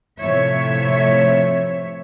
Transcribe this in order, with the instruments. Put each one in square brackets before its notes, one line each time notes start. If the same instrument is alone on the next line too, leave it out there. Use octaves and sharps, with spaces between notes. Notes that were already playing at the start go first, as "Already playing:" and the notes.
[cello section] A2 C3 F3 C#5 E5